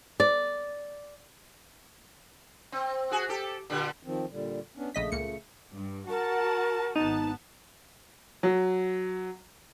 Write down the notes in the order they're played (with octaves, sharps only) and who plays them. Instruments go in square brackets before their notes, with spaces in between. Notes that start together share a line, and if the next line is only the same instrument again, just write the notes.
[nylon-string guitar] D5
[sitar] C4
F#4 G#4
G4 A4
A#2 D3 G3
[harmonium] D#3 F3 C4
A#2 D3 G3
B3 C#4 D4
[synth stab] A#1 D#5 B6 [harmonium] C#3 A3
[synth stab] C#2 A#2 C#7
[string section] G2
[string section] F#4 F#5 A5 [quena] A#4
[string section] G#1 B3 A5 [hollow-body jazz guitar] D#4
[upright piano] F#3